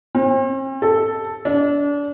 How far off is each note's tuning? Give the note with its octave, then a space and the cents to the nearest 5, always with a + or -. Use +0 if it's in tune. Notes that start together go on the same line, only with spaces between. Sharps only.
C4 +40
A4 +0
D4 -30